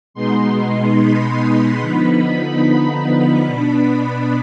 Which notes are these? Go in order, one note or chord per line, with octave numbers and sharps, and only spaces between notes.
B2 G#3 B3 D#4 C6
B5
D3 F3 B3 D#4
B5
B2 B3 D4 B5